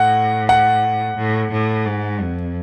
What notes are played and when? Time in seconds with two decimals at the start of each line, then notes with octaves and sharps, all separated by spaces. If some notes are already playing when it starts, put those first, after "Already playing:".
Already playing: A2 F#5
0.49 F#5
1.17 A2
1.52 A2
1.86 G#2
2.21 F2